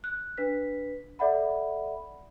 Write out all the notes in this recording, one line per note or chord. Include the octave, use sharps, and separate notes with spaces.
F#6
D4 B4 B6
A4 D5 E5 F#5 B5